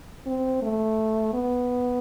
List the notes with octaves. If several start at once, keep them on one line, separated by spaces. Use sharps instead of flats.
C4
A3
B3